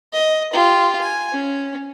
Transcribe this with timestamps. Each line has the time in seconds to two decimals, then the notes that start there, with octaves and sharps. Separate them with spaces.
0.13 D#5
0.53 F4 G4
1.01 G#5
1.33 C#4